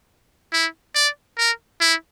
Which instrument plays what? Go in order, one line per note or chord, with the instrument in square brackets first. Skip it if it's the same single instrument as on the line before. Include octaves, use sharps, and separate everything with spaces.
[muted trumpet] E4
D5
A#4
E4